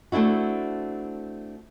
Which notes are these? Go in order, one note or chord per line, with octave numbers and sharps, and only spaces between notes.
A3 C4 D4 E4 F#4